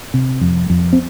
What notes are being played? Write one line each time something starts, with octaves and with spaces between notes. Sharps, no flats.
C3
F2
F2
C4